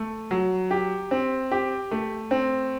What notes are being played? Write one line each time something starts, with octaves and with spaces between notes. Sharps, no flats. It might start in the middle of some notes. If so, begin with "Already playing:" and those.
Already playing: A3
F#3
G4
C4
G4
A3
C4